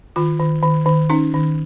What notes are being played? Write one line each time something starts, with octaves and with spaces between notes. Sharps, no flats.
D#3 F4
D#3
D#3
D#3
C#4 D#4
D#3